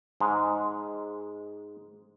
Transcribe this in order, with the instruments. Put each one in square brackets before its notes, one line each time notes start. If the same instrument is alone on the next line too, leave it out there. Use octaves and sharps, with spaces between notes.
[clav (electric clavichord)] G#2 G#3